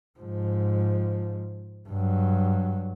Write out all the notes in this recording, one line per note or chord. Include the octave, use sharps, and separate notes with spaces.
G#2 F3
G2 F#3